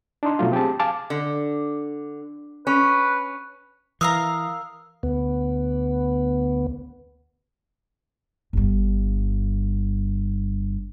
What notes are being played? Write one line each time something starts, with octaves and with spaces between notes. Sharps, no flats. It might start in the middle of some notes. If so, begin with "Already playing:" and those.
D4 D#4 C6
B2 F#3 A3 F4
C4 G4 G#4 A5
F5 G#5 A5 D6 F6
D3
C#4 B4
E3 A#4 F5 A#5 D#6 E6
D2 B3
G1 G2